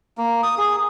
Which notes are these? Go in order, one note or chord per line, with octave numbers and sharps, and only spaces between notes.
A#3
D#6
G#4